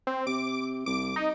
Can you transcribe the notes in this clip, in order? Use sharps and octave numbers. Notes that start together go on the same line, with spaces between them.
C4
C3 D6
C2 D6
D#4